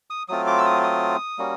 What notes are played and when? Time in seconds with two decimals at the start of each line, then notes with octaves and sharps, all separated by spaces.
0.10 D#6
0.29 F#3 A3 C4 F4 D#6
0.47 D6
0.58 E6
0.66 D#6
0.83 D#6
1.38 G3 A#3 C#4 F#4